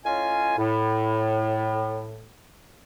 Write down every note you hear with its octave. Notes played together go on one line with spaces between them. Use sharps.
A2 C#4 F4 D#5 F5 G#5
A2